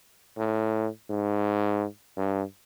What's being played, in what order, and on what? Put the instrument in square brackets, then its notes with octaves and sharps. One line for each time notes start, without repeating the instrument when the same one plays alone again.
[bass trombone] A2
G#2
G2